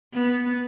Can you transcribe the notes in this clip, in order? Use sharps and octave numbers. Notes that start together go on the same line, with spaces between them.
B3